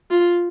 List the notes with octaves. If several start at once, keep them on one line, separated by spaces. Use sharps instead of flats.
F4